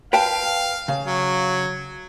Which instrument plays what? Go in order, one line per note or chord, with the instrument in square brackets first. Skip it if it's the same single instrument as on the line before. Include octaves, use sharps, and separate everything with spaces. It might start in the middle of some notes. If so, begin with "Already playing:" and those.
[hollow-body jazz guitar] B4 G5 A5 [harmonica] F5
[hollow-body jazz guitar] C#3
[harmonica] F#3